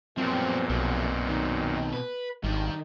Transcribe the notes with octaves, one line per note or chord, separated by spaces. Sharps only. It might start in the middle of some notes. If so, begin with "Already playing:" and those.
F#2 A#2 F3 G3 B3 C4 A#4
B1 B2 C4
D#3
B4
G#1 D#3 G3 D4